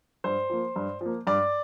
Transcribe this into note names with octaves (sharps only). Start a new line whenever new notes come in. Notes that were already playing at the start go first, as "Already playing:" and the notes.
G2 C5
F3 A#3
G2
F3 A#3
G2 D5